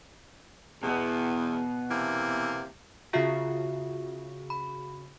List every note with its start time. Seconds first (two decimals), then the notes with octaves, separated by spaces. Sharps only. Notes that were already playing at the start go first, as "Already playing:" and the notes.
0.83 E2 B2 B3
1.91 C3 E3 A#3
3.13 C#3 F4 F#4 E5 C7
4.50 B5